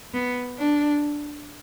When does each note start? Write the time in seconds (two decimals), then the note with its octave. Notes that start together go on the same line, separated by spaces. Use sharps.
0.14 B3
0.59 D4